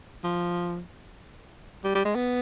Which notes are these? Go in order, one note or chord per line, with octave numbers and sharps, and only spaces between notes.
F3
G3
G3
G#3
B3